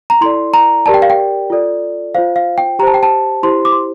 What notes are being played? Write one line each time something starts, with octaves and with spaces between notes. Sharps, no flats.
A#5
E4 A4 D5 C6
A#5
G4 A#4 D5 A5
G5
F5
G5
F4 A4 D5
F4 C5 F5
F5
G5
G4 C5 A5 A#5
G5
A5
E4 G4 C5 C6
D6
C6